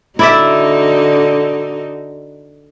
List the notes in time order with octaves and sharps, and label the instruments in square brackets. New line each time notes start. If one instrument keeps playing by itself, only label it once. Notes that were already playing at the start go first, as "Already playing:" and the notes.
[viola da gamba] D3 D#4 F#4 [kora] E4 D5 E5